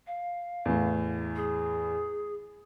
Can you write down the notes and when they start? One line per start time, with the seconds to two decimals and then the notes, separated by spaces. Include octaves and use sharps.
0.07 F5
0.65 E2 A2
1.36 G#4